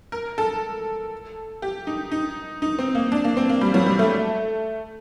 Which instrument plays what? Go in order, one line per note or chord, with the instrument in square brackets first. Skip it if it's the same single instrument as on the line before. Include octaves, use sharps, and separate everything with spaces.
[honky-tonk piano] A#4
A4
G4
D#4
D#4
D#4
C4
A#3
D4
A#3
C4
A#3
G3
F#3
G3
A3